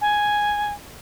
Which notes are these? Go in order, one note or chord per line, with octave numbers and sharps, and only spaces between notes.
G#5